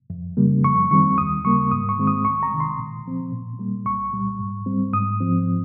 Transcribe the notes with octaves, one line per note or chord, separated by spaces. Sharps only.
F2
C#3 G3 A#3
F2 C#6
D#3 G3 C4 C#6
D#2 D#6
C#3 G3 A#3 C#6
G#2 D#6
C#6
D#3 G#3 C4
D#6
C2 C#6
A#5
C3 D#3
C6
A#2
F3 C4
A#2
G3 A#3
C2 C#6
A#2 G3
G#2
G3 C4
G#2 D#6
F3 C4